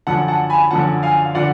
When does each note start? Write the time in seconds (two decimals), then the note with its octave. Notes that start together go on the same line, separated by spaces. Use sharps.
0.07 F#2 D3 F3 F#5 A5
0.28 F#5 A5
0.50 G#5 B5
0.71 F#2 D3 F3 F#5 A5
1.03 F5 G#5
1.25 F5
1.35 D3 F3 D5 F#5